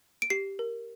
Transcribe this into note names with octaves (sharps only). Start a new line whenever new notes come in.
D7
G4 C7
A#4